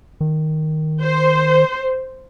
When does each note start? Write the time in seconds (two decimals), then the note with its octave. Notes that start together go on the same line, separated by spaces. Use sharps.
0.21 D#3
1.01 C5